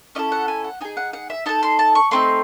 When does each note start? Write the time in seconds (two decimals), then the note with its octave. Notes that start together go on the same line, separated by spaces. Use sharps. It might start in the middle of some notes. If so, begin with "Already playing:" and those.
0.15 C#4 E4 A4 D#5
0.32 F#5
0.48 G#5
0.64 F#5
0.81 D#4 G#4 G#5
0.97 F#5
1.13 F#5
1.30 E5
1.46 D#4 A4 A5
1.63 C6
1.79 A5
1.95 C#6
2.11 A3 C4 D#4 C6